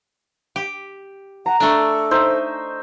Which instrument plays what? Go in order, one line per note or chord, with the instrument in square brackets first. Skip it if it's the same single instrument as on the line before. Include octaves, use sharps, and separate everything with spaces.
[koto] G4
[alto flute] F#5 [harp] A#5
[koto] A3 D4 [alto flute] A4 [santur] A5 C#6
[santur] D#4 C5 E5